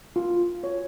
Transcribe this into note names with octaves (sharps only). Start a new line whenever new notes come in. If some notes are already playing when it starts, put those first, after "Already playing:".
F4
C#5